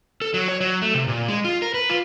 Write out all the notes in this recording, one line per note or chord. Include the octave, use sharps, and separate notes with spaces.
A4
F#3
C#5
F#3
A3
C3
A#2
G#3
F4
A#4
B4
F4